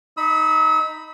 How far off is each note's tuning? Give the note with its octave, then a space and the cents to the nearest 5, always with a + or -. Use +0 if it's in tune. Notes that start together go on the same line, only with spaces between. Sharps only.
D#4 +0 B5 +0 E6 -40